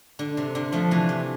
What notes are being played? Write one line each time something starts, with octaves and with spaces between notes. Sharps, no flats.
D3
C3
D3
F3 A3
C3 E3
C3